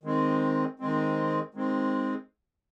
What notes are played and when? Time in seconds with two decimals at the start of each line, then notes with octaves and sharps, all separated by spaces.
0.03 D#3 G#3 C4
0.79 D#3 G#3 C4
1.54 D#3 G#3 C4